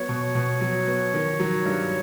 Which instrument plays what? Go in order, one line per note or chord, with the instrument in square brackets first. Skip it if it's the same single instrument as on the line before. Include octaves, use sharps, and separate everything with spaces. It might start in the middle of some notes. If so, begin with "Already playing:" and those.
Already playing: [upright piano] F#3 B3 [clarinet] C#5
[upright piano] B2
B2
F#3
B3
D#3
F#3
G2